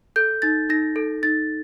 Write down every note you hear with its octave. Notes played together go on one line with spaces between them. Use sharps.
A4 G6
D#4 A6
D#4 A#6
A4
D#4 A6